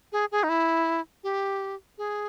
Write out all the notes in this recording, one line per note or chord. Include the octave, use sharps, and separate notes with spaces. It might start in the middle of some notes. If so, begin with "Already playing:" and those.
G#4
G#4
D#4
E4
G4
G#4